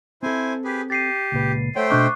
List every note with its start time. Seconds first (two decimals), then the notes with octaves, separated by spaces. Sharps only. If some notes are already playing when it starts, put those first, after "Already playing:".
0.23 C4 E4 A4 C5 G#5
0.65 G4 G#4 B4
0.90 G4 A6 C7 D#7
1.32 C#2 A#2 B4
1.76 A3 C5 C#5 F#5 G5
1.90 B2 D4 D#5 C#6 D6 F#6